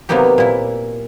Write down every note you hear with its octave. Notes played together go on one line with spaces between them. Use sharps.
C3 F#3 A#3 B3 D#4 G4
A#2 E4